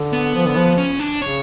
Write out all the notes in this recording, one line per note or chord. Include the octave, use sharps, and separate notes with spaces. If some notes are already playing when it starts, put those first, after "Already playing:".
Already playing: D3
B3
F3
D3
F3
C#4
D4
C#3 C#5